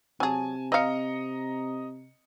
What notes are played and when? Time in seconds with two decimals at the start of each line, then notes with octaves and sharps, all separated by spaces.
0.20 C3 F#3 G#4 G#5 A5
0.72 C4 D#5 F5 A#5 C#7